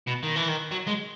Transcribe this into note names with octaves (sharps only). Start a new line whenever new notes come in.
B2
D#3
E3
D#3
F#3
G#3